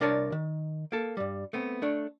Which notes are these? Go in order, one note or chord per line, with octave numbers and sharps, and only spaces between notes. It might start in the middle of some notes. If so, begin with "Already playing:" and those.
C2 D4 A#4 C#5 A5
D#3
A#3 A4
G2 G3
A3 B3 C4
A3 D4 C#5